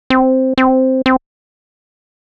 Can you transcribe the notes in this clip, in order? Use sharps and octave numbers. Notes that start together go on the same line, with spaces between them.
C4
C4
C4